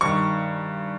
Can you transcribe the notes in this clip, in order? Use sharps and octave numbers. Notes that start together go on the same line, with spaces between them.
G2 D#3 C#6